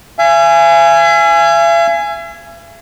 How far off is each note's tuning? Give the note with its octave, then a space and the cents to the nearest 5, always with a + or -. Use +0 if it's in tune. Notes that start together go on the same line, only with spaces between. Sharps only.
E5 +45 G#5 +0